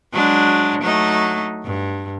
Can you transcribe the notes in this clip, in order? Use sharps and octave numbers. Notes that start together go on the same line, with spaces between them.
F#3 G#3 D4
F#3 A3 D#4
G2